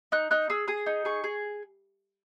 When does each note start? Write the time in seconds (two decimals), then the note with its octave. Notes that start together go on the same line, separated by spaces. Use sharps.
0.12 D#4 F#6
0.31 D#4 F#6
0.50 G#4 E6
0.68 G#4 D#6
0.86 D#4
1.05 G#4 C#6
1.24 G#4